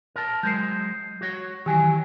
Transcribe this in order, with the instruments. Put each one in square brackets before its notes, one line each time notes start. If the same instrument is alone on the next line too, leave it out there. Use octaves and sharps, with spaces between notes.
[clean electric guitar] A#4 A5
[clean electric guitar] F#3 G#3 C5 [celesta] G6 C7
[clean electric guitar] F#4 C#5
[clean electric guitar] D#3 E3 F#3 [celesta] G4 G#5